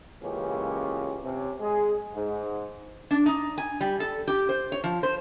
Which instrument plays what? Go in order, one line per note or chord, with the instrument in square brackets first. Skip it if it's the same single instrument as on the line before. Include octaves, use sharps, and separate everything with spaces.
[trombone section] C#2 E3 A#3 C#4 G4
C3 C#4
G#3 G#4
G#2
[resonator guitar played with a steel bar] D4
D#4
G#5
G3
A4
G4
C5
C#5
F3
C5